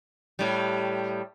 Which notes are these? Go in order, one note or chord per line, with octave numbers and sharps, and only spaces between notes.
A2 G3